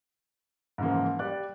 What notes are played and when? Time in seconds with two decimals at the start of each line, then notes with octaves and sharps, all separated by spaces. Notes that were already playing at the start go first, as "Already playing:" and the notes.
0.78 G#2 C#3 E3 F3 A#3
1.19 G3 G4 D5 F#6